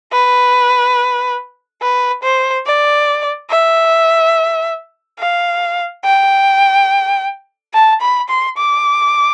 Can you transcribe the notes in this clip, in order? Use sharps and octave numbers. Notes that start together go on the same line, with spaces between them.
B4
B4
C5
D5
E5
F5
G5
A5
B5
C6
D6